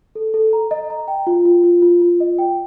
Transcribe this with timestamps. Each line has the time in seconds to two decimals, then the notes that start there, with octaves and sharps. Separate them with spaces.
0.15 A4
0.34 A4
0.53 A#5
0.71 D#5
0.90 A#5
1.08 G5
1.27 F4
1.45 F4
1.64 F4
1.82 F4
2.01 F4
2.20 D#5
2.38 G5